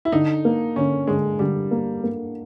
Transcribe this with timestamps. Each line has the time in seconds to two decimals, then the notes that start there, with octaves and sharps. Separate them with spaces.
0.05 E4
0.12 D3 D#4
0.45 A#3
0.76 D3 C#4
1.07 D3 G#3
1.39 D3 G3
1.71 A#3
2.04 A#3